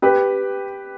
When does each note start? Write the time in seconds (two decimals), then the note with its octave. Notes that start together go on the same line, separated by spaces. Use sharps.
0.02 G4 B4